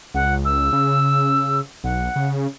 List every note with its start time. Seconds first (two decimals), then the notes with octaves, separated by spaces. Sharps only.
0.14 C#2 F#5
0.45 E6
0.73 C#3
1.84 B1 F#5
2.16 C#3